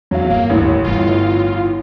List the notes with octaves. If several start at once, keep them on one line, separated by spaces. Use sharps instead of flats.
E2 F#3 F5
G1 A#3
A1 D#2 E3
D1 G1 F4